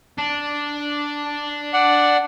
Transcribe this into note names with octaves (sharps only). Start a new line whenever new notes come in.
D4
D5 F#5